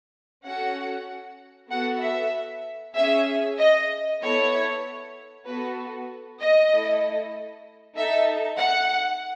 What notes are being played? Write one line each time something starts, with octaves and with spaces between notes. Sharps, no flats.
C#4 F#4 A4 F#5
B3 F#4 A4 F#5
E5
C#4 G#4 E5
D#5
B3 E4 A4 C#5
B3 F#4 A4 B4
D#5
A3 E4 A4
D#4 A4 E5
F#5